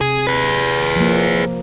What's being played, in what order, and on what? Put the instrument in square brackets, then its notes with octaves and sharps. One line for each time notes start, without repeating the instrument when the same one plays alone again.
[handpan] C3 [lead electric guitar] G#4
[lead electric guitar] G#4 B4
[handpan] F3 A#3